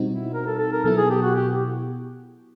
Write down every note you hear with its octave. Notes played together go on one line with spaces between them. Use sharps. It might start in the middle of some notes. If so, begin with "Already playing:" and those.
Already playing: B2 G3 C4 D#4 F#4
E4
A#4
A4
A4
A#4
B2 F#3 B3 E4 A4
G#4
G4
F#4
G4